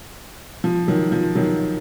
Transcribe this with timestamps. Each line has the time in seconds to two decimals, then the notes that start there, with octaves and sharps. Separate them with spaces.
0.64 F3
0.87 D#3 F#3
1.12 F3
1.35 D#3 F#3